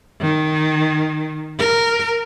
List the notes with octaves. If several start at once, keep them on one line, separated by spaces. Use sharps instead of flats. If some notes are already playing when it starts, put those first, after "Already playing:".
D#3
A#4